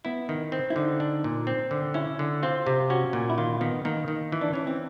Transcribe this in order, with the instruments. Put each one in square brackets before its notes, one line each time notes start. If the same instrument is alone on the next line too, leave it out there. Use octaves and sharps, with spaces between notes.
[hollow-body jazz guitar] B3 [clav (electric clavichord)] E4
[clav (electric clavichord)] D#3
C4
[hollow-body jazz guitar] E4
[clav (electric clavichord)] D3 [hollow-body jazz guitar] D#4
[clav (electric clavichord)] D4
A#2
C4
D3
[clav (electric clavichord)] C#4 [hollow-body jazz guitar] E4
[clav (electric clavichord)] D3
[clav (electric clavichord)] C4 [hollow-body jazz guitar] F4
[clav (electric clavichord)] C3
[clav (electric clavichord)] C#4 [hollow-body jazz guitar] F#4
[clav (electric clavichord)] A#2
[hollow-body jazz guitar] E4
[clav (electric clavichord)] D#3 [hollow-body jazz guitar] F4
[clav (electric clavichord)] D#3 [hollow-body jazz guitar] B3
[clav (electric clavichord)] D#3 [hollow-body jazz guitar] A#3
[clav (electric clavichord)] D#3
E3
[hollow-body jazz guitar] D4
[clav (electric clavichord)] E3 [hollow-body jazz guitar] C#4
[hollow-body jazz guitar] C4